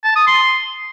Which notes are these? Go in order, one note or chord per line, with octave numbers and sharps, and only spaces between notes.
A5
D#6
C6